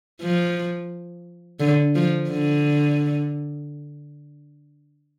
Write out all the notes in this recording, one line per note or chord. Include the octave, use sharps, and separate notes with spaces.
F3
D3
F3
D3